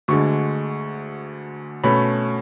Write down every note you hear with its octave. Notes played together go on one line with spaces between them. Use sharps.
D2 D3 G#3 C#6
B2 A3 C#4 B5